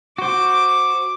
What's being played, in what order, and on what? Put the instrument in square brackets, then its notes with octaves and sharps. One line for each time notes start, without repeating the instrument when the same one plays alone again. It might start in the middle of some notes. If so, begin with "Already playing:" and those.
[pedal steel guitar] F#4 C5 [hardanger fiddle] D6